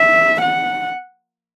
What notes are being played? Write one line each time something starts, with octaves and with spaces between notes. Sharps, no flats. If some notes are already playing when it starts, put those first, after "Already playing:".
Already playing: E5
F#5